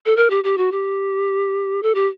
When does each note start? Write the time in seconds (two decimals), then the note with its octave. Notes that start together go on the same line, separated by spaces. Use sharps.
0.06 A4
0.17 A#4
0.30 G4
0.44 G4
0.58 F#4
0.72 G4
1.83 A4
1.95 G4